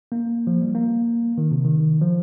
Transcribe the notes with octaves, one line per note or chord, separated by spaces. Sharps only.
A#3
F3
G3
A#3
D#3
C3
D#3
F3